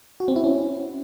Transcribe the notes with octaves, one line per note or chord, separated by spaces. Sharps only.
F#4
C4
E4
C#4